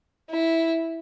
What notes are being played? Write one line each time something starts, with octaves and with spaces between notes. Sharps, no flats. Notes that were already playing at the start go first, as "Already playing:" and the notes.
E4